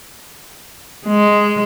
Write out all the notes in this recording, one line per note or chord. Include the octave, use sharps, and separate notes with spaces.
G#3